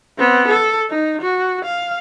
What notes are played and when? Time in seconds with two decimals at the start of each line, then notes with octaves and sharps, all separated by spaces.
0.18 B3 C4
0.48 A4
0.90 D#4
1.22 F#4
1.65 F5